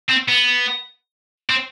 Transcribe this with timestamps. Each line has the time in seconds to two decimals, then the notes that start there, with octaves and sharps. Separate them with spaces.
0.09 C4
0.28 B3
1.50 C4